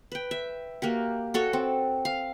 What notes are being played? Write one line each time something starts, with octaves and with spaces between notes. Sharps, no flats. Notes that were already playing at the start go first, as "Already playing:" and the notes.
B4 G5
E5
A#3 F#4 G4
F#4 A4 C#5
C4
F5